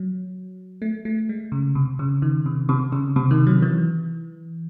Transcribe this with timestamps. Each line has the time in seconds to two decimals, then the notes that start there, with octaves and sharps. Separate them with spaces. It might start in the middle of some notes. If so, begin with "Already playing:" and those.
Already playing: F#3
0.82 A3
1.05 A3
1.29 G#3
1.52 C#3
1.75 C3
1.99 C#3
2.22 D#3
2.46 C3
2.69 C3
2.92 C#3
3.16 C3
3.31 D#3
3.47 F#3
3.62 E3